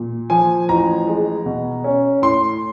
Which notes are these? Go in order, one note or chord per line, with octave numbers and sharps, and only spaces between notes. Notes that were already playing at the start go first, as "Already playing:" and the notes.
Already playing: A#2
F3 G#5
A1 A#5
G#3
B2
C#4
A2 C6